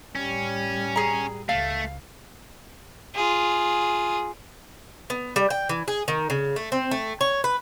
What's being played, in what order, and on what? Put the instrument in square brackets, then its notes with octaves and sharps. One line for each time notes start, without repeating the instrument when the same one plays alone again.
[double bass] A2 G3 [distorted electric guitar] C#4
[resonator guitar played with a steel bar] G#4 A#5
[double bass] C#2 [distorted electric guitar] A3 [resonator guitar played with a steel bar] F5
[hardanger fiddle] F4 G#4
[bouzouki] B3
G3
G5
E3
G#4
D#3
C#3
A3
C4
A3
C#5
B4